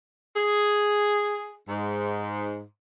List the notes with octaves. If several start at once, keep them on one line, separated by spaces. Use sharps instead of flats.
G#4
G#2